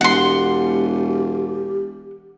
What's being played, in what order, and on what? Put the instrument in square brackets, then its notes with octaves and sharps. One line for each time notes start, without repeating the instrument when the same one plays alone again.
[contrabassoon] E1 [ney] G4 [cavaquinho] F#5 C6